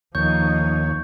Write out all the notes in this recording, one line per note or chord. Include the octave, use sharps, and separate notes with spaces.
D#2 F3 D#4 C#5 C#6 G6